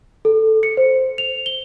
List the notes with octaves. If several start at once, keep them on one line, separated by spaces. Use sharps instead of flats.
A4
C#7
C5
F7
G7